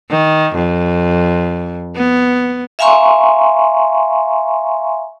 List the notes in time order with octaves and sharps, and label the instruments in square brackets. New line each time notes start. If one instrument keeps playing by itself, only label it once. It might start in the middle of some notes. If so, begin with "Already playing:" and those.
[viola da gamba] D#3
F2
B3
[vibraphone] E5 F5 G#5 A#5 C6 C#6